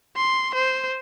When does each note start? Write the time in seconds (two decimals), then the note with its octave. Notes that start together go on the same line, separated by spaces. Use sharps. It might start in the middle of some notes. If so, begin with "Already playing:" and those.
0.16 C6
0.54 C5